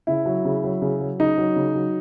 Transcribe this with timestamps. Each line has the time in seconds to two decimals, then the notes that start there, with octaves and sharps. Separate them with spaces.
0.07 C#3 E4
0.26 F#3
0.45 C#3
0.64 F#3
0.82 C#3
1.01 F#3
1.20 C#3 D#4
1.38 F#3
1.56 C#3
1.75 F#3